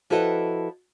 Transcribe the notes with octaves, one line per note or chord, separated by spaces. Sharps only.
F3 E4 F#4 A4 B4 D#5